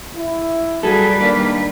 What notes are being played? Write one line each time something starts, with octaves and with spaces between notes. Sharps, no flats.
E4
F#3 G3 G#4 A4 B4
D#3 A#3 D4 D5